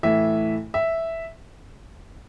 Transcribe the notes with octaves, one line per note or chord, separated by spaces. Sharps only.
A2 E3 E5
E5